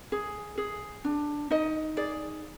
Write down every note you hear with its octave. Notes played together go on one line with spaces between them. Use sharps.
G#4
G#4
D4
D#4 D#5
G#4 D5